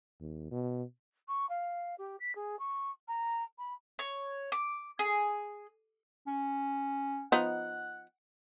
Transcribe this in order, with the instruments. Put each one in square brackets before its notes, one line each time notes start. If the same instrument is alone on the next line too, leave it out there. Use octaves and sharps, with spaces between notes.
[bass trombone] D#2
B2
[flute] C#6
F5
G4
B6
G#4
C#6
A#5
B5
[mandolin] C#5
D6
G#4
[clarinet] C#4
[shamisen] F3 B3 D#4 [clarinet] F#5